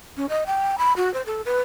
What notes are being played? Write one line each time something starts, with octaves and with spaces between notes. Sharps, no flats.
C#4
D#5
G5
B5
F#4
C5
A4
B4